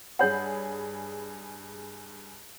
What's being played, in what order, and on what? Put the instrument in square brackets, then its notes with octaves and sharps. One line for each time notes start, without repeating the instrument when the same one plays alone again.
[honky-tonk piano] G2 G#4 B5 [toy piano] C#5 F#5